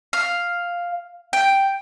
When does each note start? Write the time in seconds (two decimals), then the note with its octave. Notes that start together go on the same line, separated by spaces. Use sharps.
0.13 F5
1.33 G5